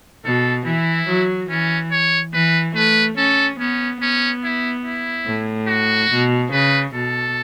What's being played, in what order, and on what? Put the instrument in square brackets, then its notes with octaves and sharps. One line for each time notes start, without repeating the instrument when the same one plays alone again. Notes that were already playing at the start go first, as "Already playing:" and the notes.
[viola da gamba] B2 [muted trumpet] A4
[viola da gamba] E3 [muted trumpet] E4
[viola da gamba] F#3
[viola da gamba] E3 [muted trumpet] C#4
[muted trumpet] C#5
[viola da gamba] E3 [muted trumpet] B4
[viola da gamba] A3 [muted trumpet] B4
[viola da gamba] C#4 [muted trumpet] A4
[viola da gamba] B3 [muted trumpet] C#4
[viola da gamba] B3 [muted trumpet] C#4
[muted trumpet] E4
E4
[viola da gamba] A2
[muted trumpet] F#4
[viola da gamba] B2
[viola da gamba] C#3 [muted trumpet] B4
[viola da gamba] B2 [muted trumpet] A4